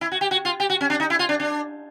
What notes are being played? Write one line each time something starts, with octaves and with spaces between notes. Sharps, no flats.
E4
F#4
G4
F#4
F4
G4
F#4
C#4
D4
D#4
E4
F4
D4
D4